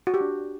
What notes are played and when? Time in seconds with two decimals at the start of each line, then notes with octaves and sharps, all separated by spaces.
0.07 F#4
0.14 G4
0.21 D4